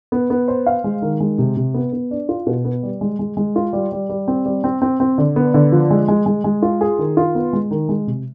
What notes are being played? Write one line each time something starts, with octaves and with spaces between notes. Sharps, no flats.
B3
B3
C5
F5
G#3
D#3
G#3
C3
C3
B3
B3
D4
F4
B2
B3
G3
G#3
G#3
G#3
F4
G3
G3
G3
C4
G3
C4
C4
C4
D3
B3
D3
F3
G#3
G#3
G#3
G#3
F4
G#4
D#3
F4
B3
G#3
D#3
G#3
C3